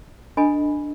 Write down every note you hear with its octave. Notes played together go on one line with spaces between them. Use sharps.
D4 A4 D#5 G#5 B5